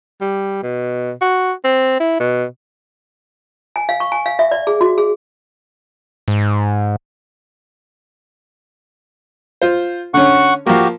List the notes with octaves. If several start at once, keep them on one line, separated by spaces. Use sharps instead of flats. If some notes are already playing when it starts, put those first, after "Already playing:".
G3
B2
F#4
C4
E4
B2
G#5
F5
C#6
G#5
F5
E5
D5
G#4
F#4
G#4
G#2
F4 C5
D3 C#4 F#5 C#6
F3 A#3 F#4 G4